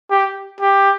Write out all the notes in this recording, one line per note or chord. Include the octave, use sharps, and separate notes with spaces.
G4
G4